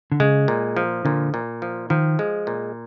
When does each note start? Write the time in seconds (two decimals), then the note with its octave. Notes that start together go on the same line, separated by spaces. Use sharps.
0.12 D3
0.20 C#3 G#3
0.48 A#2
0.77 F3
1.05 A#2 D3
1.34 A#2
1.62 F3
1.90 D#3 F3
2.19 G#3
2.47 A#2